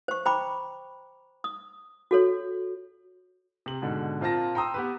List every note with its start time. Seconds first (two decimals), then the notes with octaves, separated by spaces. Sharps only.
0.08 C5 C#6
0.26 C5 G5 A#5 B5 D6
1.44 D#6
2.11 F#4 A4 C#5
3.66 C3 F#7
3.82 G#2 B2 D3
4.21 A#2 C4 F4 A5 A#6
4.55 G5 A#5 C6 D#6 E6
4.74 B3 G4 B4